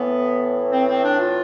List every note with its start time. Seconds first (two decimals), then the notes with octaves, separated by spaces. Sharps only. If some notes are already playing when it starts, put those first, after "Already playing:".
Already playing: A2 E3 B3
0.70 C4
0.86 C4
1.02 D4
1.19 F4